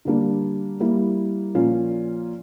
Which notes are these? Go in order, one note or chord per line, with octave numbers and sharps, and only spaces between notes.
D3 G3 A#3 D4
G3 A#3 E4
A#2 F3 A#3 C#4 F4